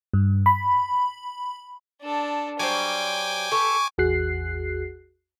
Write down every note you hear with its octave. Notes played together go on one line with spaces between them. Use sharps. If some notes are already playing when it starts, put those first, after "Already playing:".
G2
B5
D4 A4
F#3 G3 C5 G5 G#5 D6
B3 G4 A4 C#6
A1 E2 F#4 G#4 F#6 C7